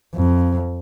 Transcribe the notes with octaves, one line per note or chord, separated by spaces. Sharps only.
F2